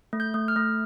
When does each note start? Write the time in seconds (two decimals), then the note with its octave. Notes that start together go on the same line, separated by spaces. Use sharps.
0.13 A3
0.20 G6
0.34 A3
0.48 F6
0.56 A3